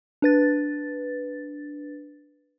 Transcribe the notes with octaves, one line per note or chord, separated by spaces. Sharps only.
D4 B4 A6